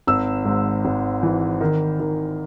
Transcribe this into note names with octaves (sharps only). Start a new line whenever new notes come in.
G#1 E6
G#2
G#1
E3
D#3
D#3